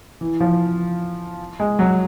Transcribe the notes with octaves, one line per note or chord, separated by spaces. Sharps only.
E3
F3
G#3
F#3